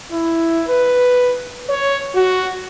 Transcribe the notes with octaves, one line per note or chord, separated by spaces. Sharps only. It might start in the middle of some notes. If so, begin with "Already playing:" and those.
E4
B4
C#5
F#4